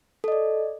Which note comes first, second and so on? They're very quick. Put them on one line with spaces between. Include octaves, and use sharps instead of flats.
A4 D#5 D5